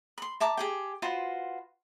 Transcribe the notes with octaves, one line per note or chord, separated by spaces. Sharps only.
B5 C6
E5 A5 A#5 D6
G4 G#4 G5
F4 F#4 B4 C5